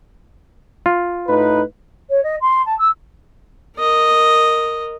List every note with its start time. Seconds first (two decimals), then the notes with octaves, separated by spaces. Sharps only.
0.86 F4
1.28 A2 D#4 B4
2.10 C#5
2.23 D#5
2.41 C6
2.66 A5
2.78 E6
3.78 A#4 D#5